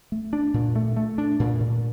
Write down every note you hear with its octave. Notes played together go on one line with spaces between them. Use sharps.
A3
D4
A#2
A3
A3
D4
A#2
A#2